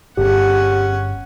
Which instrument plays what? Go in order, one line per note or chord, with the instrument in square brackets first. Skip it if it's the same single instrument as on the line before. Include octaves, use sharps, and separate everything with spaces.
[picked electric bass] G1 [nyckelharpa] C#4 F#5 [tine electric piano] G4 G#4